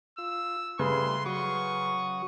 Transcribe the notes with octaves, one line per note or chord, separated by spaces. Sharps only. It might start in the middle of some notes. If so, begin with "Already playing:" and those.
F4 E6
C#3 G3 A3 B4 C6
F#3 F#4 C#6 D#6